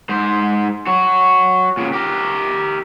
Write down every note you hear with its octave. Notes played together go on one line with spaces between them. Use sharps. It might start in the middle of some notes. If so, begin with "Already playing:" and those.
G#2 C5
F#4 C#5
A#2 C#3
G4 A#4